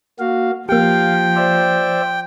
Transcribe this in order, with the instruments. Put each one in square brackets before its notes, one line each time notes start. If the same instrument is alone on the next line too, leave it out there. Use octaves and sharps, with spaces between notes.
[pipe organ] A#3 F#4 F5
[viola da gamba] F3 [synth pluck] A#3 G4 [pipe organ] F5 [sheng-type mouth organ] G5
[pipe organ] C5 D5 E5